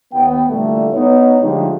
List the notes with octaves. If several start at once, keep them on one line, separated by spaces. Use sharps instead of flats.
D#2 B3 G5
A#2 D3 E3 G3 A3
B3 D#4 C#5
D3 F3 G#3 A3 D#4 G4